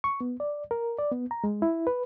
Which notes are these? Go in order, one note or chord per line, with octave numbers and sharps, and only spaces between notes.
C#6
B3
D5
A#4
D5
B3
A#5
G#3
E4
B4